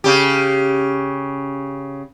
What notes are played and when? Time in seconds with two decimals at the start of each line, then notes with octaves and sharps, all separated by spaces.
0.04 C#3 G4